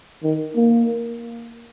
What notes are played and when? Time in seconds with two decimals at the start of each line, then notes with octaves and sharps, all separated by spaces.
0.23 D#3
0.56 A#3